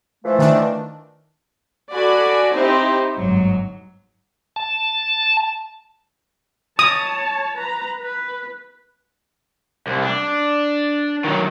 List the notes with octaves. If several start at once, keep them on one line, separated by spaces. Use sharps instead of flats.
E3 F3 A3
D#3 D4
F#4 A4 D5 G#5 B5
C4 D#4 E4 G4 C5
G1 G#2 F#3
A5
C#5 A5 D#6
B4 A#5
B4
C2
D4
D#3 F#3